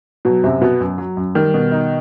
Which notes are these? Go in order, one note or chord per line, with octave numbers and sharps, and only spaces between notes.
B2 F#3
F#2 C3
B2 B3
F#2
F#3
F#2
D#3 G3
B2
D#4